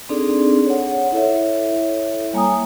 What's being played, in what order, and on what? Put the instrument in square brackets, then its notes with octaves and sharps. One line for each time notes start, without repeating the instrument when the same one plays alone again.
[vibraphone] C4 D4 D#4 G#4 A4 D5
C#5 F#5
E4 A4 C#5 E5
G3 A#3 G#5 A#5 D#6